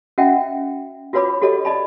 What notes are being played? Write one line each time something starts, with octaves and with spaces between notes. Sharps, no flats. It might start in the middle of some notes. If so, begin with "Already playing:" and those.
C#4 F#4 D#5 E5 F#5 G5
F4 F#4 B4 C#5 B5 D6
F#4 G4 A4 C#5 D#5
D5 D#5 A5 B5